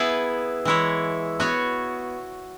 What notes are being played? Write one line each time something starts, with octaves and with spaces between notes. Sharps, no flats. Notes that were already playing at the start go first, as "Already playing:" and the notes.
Already playing: B3 E4 G#4 B4
E3 G#3 E4 C#5
B3 F#4 C#5